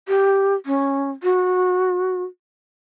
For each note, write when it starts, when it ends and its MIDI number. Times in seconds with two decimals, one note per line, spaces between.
0.08 0.55 67
0.66 1.11 61
1.23 2.23 66